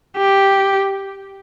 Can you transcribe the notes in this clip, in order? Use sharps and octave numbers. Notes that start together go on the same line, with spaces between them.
G4